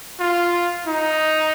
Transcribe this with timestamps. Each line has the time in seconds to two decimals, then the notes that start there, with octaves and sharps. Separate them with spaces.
0.20 F4
0.87 D#4